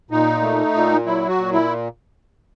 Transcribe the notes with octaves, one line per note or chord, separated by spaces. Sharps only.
A#2 D#4
A3
A#2
F#3 E4
F#4
A#2
E4